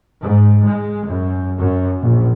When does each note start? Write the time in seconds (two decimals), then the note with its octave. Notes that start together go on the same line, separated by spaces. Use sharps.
0.20 G#2
0.67 G#3
1.06 F#2
1.60 F#2
2.02 A#1